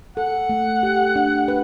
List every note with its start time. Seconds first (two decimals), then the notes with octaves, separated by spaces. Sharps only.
0.17 A4 F#5
0.49 A3
0.83 G4
1.16 D4
1.48 B4